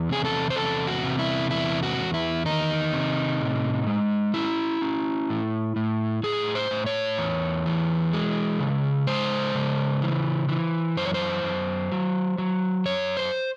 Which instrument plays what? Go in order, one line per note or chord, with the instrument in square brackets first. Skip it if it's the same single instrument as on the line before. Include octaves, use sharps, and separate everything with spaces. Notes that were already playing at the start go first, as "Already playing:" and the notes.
Already playing: [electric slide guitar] E2
C3 G#4
A4
C5
E2 A4
F#4
C3
E4
E2 E4
F#4
E2
E4
D#3 D#4
C3
A2
G#3
C#4 E4
C#4
A2
A2
A2 G#4
C5
A2
C#5
E2
E3
G#3
C#3
G#3 C5
C#3
E3
E3
F#2 C5
C#5
C5
F#2
F#3
F#3
F#2 C#5
C5